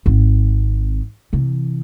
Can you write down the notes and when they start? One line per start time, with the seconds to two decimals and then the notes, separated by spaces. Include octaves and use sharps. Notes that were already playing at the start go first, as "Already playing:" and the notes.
0.06 G#1 C4
1.33 C3 E3